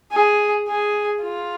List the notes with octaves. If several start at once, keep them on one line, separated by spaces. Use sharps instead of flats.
G#4
G#4
F4